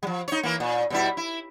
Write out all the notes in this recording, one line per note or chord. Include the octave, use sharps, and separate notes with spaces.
F3 G3
D#4 C#5
E3 A#3
A#2
B2 G3 E4
E4